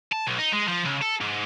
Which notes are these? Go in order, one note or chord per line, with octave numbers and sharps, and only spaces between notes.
A5
B1
D#4
G#3
F3
C#2
A4
G#2